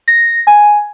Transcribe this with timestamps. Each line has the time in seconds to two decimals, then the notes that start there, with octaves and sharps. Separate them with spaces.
0.08 A#6
0.47 G#5